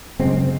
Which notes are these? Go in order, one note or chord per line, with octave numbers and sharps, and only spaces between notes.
F#1 F#2 C#3 G#3 C4